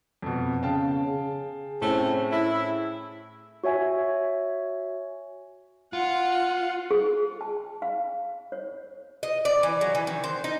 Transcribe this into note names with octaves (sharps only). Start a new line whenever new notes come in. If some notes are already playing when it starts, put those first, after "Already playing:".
F2 B2
C#3 F5 G5 A5
G#4
A2 A3 C4 C#4
E4
F#4 C#5 E5 G#5
F4 F#5
G#4
A5
F5
C#5
D#5
D5
E3
F#3
E3
D#3
C5
D#4